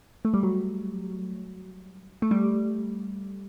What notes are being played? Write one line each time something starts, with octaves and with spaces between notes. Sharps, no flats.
A3
G3
F#3
A3
G3